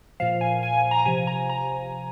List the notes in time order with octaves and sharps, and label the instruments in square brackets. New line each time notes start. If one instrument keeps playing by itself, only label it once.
[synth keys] A#2 F3 F5
G#5
G#5
G#5
A#5
C3 F3 G#5
A#5
A#5